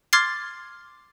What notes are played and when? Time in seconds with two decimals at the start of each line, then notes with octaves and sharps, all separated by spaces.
0.13 C6 D6 F6 G#6 A6 C7